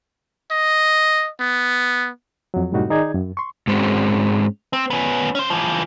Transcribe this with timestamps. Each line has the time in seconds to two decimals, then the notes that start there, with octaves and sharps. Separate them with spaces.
0.51 D#5
1.40 B3
2.54 F2 F#3
2.72 F#2 A2 C3 G3 D#4 F#4
2.90 D#3 D#4 G#4 D5 G#6
3.15 F#2
3.37 C6 C#6
3.67 G#2 G#3 C4 C#4 F#4
4.73 C4
4.90 B3 C#4
5.35 C#4 C5
5.50 E3 F3